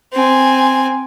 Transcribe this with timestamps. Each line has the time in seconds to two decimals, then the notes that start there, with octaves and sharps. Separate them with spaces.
0.13 C4 G#5